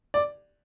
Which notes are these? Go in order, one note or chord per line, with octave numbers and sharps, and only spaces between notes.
D5